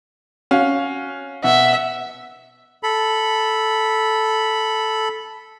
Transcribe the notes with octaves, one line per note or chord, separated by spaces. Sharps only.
C#4 F#4 F5
B2 E5 F#5
A4 B5